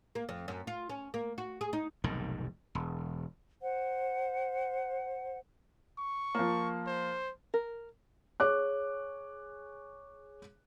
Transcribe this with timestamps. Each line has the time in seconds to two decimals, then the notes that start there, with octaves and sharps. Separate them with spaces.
0.15 A#3
0.29 F2
0.48 F#2
0.67 F4
0.90 C#4
1.14 A#3
1.38 F#4
1.61 G#4
1.73 D#4
2.04 F1 B1 G#2 D#3
2.75 E1
3.61 C5 F#5
5.99 C#6
6.35 F3 A#3
6.87 C5
7.54 A#4
8.40 G#4 C#5 D6 F#6